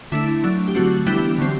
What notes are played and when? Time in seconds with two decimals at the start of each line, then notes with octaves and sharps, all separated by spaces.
0.12 D3 A3 D4 E4
0.44 F#3 A3 D4
0.68 G4
0.75 D3 F#3 A3 C4 F#4
1.06 E3 G3 B3 D4 E4 G4
1.38 D3 F#3 C4